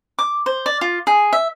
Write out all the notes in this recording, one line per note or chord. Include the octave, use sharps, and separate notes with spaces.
D6
C5
D5
F4
G#4
E5